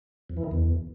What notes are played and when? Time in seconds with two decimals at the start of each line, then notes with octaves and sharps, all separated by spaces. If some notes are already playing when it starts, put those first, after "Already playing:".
0.30 F2
0.37 E3
0.44 D#3
0.51 E2